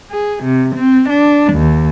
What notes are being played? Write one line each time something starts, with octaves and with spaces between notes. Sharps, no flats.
G#4
C3
C4
D4
D#2